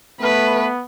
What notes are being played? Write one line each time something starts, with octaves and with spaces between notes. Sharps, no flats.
A3 B3 B4